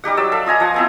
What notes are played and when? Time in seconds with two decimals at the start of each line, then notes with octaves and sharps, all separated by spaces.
0.04 G3 D#4 G4 F#5
0.17 F#3 D5 E6
0.32 A4 E5 F5
0.46 F4 D#5 G#5 A#5
0.60 F3 F#5 G#5
0.74 B3 C4 E4